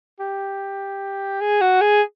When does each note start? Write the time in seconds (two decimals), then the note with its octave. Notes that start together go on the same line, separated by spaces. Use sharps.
0.20 G4
1.41 G#4
1.61 F#4
1.81 G#4